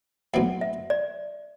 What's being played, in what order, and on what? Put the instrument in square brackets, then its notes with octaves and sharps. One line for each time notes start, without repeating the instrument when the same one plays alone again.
[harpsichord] B1 A2 F#3 C4 E4 [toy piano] F#5
[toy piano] E5
D5